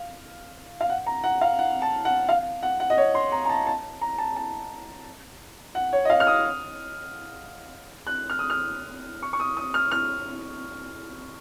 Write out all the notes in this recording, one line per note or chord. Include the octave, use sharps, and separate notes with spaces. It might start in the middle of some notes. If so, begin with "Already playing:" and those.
Already playing: F5
F5
F#5
A#5
F#5
F5
F#5
A5
F#5
F5
F#5
F#5
D#5
C#5
C6
A#5
A#5
A5
A5
A#5
A5
A5
F#5
C#5
D#5
F5
F6
D#6
F#6
F6
D#6
F6
C#6
C#6
D#6
D#6
F6
F6